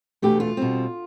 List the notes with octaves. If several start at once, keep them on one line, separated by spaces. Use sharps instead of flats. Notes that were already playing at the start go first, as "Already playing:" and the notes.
E2 B2 A3 D4 G4
F4
B2 G3 C4